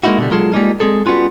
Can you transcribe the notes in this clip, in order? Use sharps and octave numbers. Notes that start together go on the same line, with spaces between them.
G#3 A#3 C#4 D#4 E4 F#4
B2 D3 G3
F#3 G#3 F4 G#4 A4
G3 G#3 A#3 D#4 F4
G#3 C4 G#4 A4
G3 B3 C#4 F4 F#4